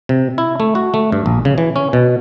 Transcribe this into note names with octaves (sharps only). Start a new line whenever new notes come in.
C3
E4
A3
F#4
A3
G2
A#1
C#3
E3
C#4
B2